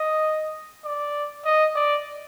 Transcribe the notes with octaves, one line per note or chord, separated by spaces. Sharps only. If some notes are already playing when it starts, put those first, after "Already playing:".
Already playing: D#5
D5
D#5
D5